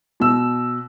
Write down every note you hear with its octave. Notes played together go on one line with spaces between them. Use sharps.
B2 E6